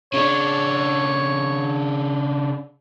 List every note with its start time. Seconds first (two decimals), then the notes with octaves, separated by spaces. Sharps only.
0.14 C#3 D4 C#5